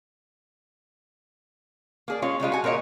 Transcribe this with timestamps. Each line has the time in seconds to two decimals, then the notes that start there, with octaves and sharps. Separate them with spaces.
2.08 A#3 G#4 D5
2.22 G#3 C#4 F4 C#5
2.40 C#3 G3 G#3 F4
2.52 F#4 G#5
2.64 A#2 A#4 C#5 D#5